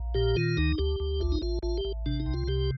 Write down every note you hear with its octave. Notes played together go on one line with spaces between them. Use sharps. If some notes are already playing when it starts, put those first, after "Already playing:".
Already playing: A#1
A#2 G4
D#3 F4
D2 D#4
D2 G4
D2
A1 F4
D#4
A1 F4
A1 F4
G4
A1
C3 D4
D#4
C2
F4
C3 G4